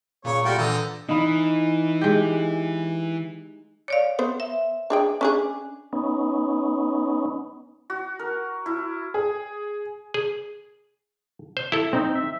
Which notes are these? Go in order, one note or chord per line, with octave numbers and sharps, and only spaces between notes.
A#2 C#3 A#3 C#5
G3 A3 F4 F#4 A#4 G5
A#2 D3 E3 A4 A#5 D#6 G6
E3 D#4 F5 B5
G#3 G4
C#5 D5 F5
B3 C5
E5
D4 G#4 G5
C#4 D4 G#4
B3 C#4 D#4
F#4
A#4
E4
G#4
G#4
C5
E4 A4
C4 D#4
E5